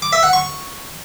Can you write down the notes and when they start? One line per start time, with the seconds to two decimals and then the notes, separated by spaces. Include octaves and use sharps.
0.02 D6
0.13 E5
0.23 F#5
0.33 C#6